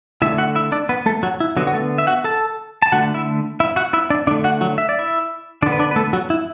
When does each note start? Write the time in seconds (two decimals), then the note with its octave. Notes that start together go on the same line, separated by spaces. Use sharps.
0.22 D3 A3 E4 E5
0.38 F#4 F#5
0.55 E4 E5
0.72 D4 D5
0.89 B3 B4
1.06 A3 A4
1.23 F#3 F#4
1.40 E4
1.57 D3 F#3 B3 F#4
1.67 F#4
1.74 A3 A4
1.98 E5
2.07 F#4 F#5
2.24 A4 A5
2.82 A5
2.92 D3 A3 F#4 F#5
3.14 E4 E5
3.60 E4 E5
3.76 F#4 F#5
3.93 E4 E5
4.10 D4 D5
4.27 D3 D4 D5
4.31 A3
4.44 F#4 F#5
4.61 F#3 F#4
4.78 E5
4.89 D5
4.99 E4 E5
5.62 D3 D4 D5
5.66 B3
5.72 B4
5.79 D4 D5
5.91 B4
5.96 A3 A4
6.13 F#3 F#4
6.30 E4